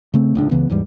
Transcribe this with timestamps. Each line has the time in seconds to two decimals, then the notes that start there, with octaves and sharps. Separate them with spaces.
0.14 C#3 A3 C4
0.35 D1 C#2 D4
0.51 C#2 C#3 E3 B3
0.70 D#2 G#2 E3 G3